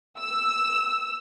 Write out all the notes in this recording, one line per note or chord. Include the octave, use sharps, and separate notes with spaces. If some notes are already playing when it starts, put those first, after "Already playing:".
E6